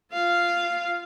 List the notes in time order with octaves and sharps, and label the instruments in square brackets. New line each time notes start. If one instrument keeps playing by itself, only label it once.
[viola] F4 F5